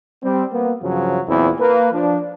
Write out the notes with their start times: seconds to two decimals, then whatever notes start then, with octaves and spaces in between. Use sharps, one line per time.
0.23 G3 C4
0.53 A#3 B3
0.82 G2 C#3 F3 F#3
1.28 E2 A#2 C4 E4
1.60 A#3 B4
1.92 F3 D4